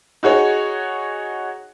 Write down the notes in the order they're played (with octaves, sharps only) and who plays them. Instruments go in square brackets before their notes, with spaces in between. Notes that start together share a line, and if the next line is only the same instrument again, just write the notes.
[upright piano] D#4 F#4 G#4 C#5